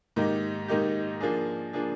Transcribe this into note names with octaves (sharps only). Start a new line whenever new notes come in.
G#2 D#3 A#3 D#4 G4
G#2 D#3 A#3 D#4 G4
F3 A#3 D4 G#4
F3 A#3 D4 G#4